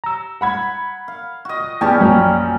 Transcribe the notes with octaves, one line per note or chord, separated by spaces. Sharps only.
A#5 E6
F#5 B5 G#6
F5
F#4 D#5
E2 G3 C#4 G4 G5 A5
A#1 F#2 F#3 A#3